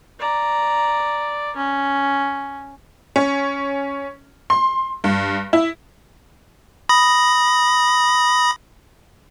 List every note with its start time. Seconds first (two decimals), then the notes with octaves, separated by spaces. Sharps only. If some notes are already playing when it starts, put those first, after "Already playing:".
0.19 D5 A#5
1.56 C#4
3.16 C#4
4.50 C6
5.04 G2
5.53 E4
6.89 B5 D#6 A#6